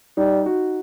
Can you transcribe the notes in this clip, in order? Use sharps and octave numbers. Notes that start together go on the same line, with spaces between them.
G3 D#4
F#4